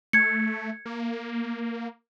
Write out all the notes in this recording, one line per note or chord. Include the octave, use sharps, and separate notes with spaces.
A3 G#6 C#7
A#3